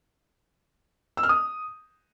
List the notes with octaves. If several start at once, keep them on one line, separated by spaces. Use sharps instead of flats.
E6
F6
D#6